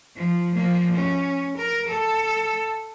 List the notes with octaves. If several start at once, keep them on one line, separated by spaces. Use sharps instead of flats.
F3
F3 A#3
C#4
A#4
A4